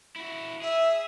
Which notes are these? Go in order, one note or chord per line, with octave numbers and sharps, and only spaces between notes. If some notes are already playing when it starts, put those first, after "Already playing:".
E4 F#4
G#4 E5